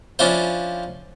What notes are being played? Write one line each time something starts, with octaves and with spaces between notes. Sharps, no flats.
F3 C#4 D4 E4 F4 C5